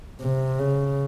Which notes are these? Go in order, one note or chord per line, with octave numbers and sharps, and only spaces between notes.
C3
C#3